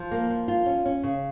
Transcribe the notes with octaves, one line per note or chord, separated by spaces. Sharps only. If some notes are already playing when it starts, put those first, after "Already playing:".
Already playing: F3
A#3
F3
F4
C#4
C#4
C#3